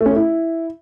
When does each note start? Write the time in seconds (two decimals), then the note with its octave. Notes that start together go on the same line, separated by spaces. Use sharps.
0.01 A3
0.06 C#4
0.11 A3
0.16 E4